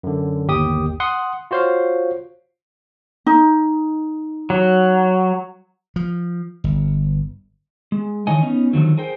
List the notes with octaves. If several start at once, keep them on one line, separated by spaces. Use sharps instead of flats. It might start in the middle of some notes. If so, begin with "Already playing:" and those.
F#2 D3
G1 D#2 G4 D#6
F#5 C6 D#6
F4 F#4 C5 C#5 F5
D#4
F#3
F3
G1
G#3
D#3 E3 C#5 D#5 G#5
B3 C#4 D#4
D3 D#3 F3 F#3
G#4 A#4 C5 G5